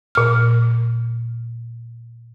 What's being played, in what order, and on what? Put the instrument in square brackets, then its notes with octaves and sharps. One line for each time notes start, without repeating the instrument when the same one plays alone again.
[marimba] A#2 F6